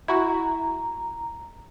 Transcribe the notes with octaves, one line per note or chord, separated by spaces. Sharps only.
E4 F#4 A#5